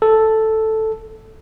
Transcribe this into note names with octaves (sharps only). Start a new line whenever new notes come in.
A4